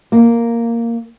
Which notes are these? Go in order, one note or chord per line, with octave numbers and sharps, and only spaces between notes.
A#3